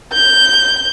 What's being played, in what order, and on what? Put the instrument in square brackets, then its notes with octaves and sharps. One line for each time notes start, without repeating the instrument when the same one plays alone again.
[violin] G6